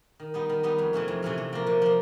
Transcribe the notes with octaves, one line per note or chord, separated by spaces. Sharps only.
D#3
G3 B3 D#4
D#3
G3 B3 D#4
F2
C3 E3 A3 C#4
F2
C3 E3 A3 C#4
C3
F3 A#3
C3
F3 A#3